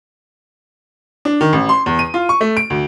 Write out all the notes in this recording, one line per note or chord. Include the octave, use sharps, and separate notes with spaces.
D4
D#3
A1
C6
E2
D#7
F4
C#6
A3
D7
D2